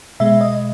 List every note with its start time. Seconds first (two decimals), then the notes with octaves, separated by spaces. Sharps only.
0.20 B2 G#3 E5
0.41 D#5